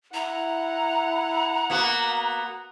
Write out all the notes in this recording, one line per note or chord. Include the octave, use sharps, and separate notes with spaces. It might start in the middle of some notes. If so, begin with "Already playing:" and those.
E4 F#5 A#5
A#3 B3 F#4